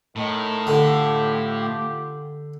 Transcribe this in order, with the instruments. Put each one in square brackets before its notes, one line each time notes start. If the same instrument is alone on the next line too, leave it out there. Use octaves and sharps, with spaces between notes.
[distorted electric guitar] A2 [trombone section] D#3
[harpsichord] D3 [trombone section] F4 G4